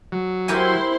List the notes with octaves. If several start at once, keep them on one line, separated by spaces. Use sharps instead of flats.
F#3
E4 G4 A#4 C5 G#5 C6